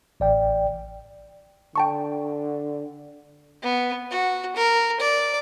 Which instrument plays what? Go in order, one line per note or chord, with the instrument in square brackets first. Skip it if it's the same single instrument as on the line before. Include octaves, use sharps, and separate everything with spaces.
[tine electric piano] A1 D5 G5
[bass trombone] D3 [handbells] G5 A5 C#6
[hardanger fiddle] B3
F#4
A#4
D5